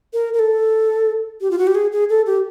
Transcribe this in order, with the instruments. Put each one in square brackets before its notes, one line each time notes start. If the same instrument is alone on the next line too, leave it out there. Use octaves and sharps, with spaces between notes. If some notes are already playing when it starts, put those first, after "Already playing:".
[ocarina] A#4
A#4
A4
G4
F4
F#4
G4
G#4
G#4
A4
G4